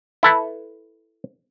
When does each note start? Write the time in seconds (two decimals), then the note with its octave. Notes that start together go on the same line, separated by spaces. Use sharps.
0.23 E4 A4 B4